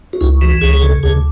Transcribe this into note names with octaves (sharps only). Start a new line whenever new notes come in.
F#4
C#2 E4
E3 F#4
C#2 G#4
G#4
C#3 A4
D2 G#4